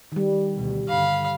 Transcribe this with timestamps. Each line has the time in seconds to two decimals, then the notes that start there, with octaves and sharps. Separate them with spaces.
0.12 D#3 G3
0.54 D2 B2
0.89 G2 D3 F5 B5